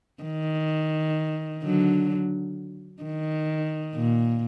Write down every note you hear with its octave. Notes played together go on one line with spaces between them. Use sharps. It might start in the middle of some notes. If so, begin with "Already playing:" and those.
D#3
D3 F#3
D#3
A#2